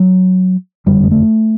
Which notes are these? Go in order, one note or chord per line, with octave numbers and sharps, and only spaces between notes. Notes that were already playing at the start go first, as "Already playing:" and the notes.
Already playing: F#3
F#1 F2 D3 G3
G#3
A3